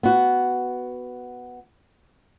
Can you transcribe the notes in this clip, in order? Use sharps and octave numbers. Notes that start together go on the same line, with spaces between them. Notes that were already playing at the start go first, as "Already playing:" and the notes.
B3 F#4